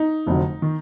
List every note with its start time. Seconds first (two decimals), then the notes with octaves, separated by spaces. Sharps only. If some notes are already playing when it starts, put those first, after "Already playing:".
Already playing: D#4
0.27 F1 F2 D3 F#3
0.62 D#3